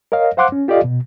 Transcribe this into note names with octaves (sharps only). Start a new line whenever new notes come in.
A#4 C#5 D#5 F5
C5 F5 F#5 C6 D6 F#6
C#4
F4 G4 A4 D5 D#5 F5
B2